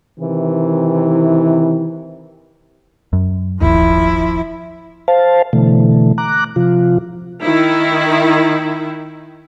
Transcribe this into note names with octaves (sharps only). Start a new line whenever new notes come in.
C3 D#3 E3
F#2
D#1 G#1 D#2 F3 E4
C5 F5 A5
B2 D3 E3 A3
A#5 D6 F#6
C3 F3 F4
D#3 E4